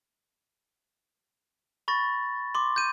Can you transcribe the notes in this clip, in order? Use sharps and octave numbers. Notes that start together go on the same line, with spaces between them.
B5 C#6 A6 A#6
C6 D6
G6 D#7